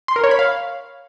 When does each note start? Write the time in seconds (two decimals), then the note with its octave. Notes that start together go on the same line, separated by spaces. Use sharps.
0.08 C6
0.16 A#4
0.24 C#5
0.31 B5
0.39 F5